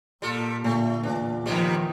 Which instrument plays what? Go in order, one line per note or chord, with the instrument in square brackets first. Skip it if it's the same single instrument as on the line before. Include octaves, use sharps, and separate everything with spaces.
[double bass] A#2 A#3 [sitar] G3 F4 A4
[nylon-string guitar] A#2 [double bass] D3 [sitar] A3
[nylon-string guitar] E2 A#2 [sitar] D4
[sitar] G#2 C3 G3 [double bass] D#3 F3